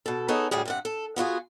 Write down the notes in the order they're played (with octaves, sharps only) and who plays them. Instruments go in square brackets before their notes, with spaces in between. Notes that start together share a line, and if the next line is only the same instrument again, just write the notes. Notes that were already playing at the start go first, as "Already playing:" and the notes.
[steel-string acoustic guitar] B2 A4
B3 D#4 G#4 A4 C#5
D2 A2 G3 G#4
G2 C3 F#5
A4
B3 F4 F#4 G#4